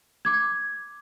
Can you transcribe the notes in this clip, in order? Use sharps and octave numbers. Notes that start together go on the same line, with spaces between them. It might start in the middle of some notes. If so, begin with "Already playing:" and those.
D6 G#6